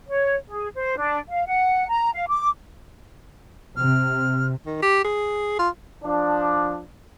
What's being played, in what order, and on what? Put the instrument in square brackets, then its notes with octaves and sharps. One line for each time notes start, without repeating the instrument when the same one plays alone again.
[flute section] C#5
G#4
C5
D4
F5
F#5
A#5
F5
D6
[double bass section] C3 [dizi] F6
[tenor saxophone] D#3
G4
G#4
F4
[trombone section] F3 D4